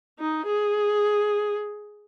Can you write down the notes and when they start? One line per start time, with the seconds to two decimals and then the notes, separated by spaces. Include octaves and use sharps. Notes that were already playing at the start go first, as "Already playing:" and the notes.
0.19 D#4
0.46 G#4